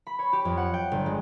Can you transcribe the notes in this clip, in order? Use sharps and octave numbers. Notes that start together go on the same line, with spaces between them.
B5
C#5
G4
F2
F#5
G5
G1
G#3